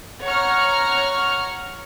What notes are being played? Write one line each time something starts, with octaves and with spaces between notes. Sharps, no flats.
C#5 F#5 A#5 C#6 F6